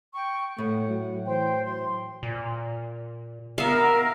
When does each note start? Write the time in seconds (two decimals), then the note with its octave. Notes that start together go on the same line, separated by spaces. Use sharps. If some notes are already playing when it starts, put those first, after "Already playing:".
0.13 G5 C#6
0.58 A2 A3 F#5
0.88 F#3
1.26 E3 C5 G5
1.64 F#3 C6
2.23 A#2
3.58 B3 A#4 E5 F5